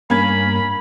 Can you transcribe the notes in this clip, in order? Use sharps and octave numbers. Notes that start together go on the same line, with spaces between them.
G2 A#3 C#4 B5 G#6